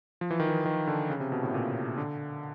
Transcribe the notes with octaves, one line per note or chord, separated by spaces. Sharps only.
F3
E3
D#3
E3
D#3
D3
C#3
C3
B2
A2
A#2
C3
D3